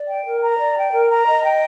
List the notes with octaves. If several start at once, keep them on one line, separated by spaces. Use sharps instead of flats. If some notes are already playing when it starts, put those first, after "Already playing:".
Already playing: D5
G5
A#4
A#5
D5
G5
A#4
A#5
D#5
G5